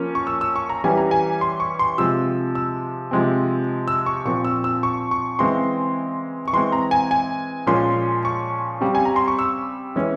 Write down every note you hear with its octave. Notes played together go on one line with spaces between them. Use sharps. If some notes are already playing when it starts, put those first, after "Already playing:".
Already playing: F3 A#3 C#4
C#6
E6
E6
C#6
A#5
E3 G3 C#4 G#5
A#5
G#5
C6
C#6
C6
C3 F3 G#3 E6
E6
C3 F3 G#3 C4
E6
C#6
A#2 F3 C4 C#6
E6
E6
C#6
C#6
C#3 E3 G#3 C4 C6
C#6
E3 G#3 C4 C6
A#5
G#5
G#5
A#2 F3 G#3 C#4 C6
C#6
C#3 G3 C4
G#5
A#5
C6
C#6
E6
E3 G#3 C#4